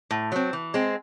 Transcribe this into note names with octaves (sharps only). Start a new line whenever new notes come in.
A2
F#3 C4
E3
G#3 C4